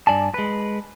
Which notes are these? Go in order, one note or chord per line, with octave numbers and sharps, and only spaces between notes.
G2 D5 G#5 A5
G#3 B4